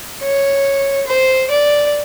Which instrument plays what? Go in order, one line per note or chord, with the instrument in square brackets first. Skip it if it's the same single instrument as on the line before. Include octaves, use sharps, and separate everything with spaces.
[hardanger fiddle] C#5
C5
D5